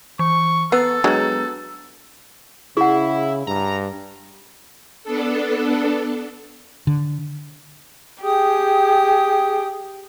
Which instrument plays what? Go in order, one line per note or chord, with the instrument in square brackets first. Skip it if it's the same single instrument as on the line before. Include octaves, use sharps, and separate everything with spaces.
[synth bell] E3 [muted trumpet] C#6
[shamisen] B3 [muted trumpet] A4 [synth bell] A#5 E6 C7
[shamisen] F#3 G#3 [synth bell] B3 D4 B4
[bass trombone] C#3 [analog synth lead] E4 [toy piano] G#4 F#5
[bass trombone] G2 [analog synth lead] A#5
[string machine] B3 D4 A4
[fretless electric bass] D3
[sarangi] G4 [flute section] G#4 G5 D#6